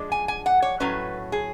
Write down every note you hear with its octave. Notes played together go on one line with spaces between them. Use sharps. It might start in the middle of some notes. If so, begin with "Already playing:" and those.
Already playing: F3 G#3 D4
G#5
G#5
F#5
C#5
A2 F#3 A3 C#4 B4
G#4